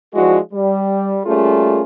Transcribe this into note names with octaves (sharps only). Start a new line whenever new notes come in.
F3 G#3 D4 E4 F#4
G3
G3 A3 A#3 C#4 F4 G#4